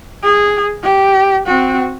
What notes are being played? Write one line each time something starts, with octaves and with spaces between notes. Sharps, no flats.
G#4
G4
C4 F#4